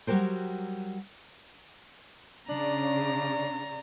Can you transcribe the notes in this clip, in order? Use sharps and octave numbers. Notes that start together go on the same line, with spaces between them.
F#3 G3 F#4 G4 A#4 C5
C#3 D4 D5 A#5